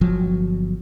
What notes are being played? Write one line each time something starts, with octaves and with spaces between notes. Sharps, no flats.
G1 F3 F#3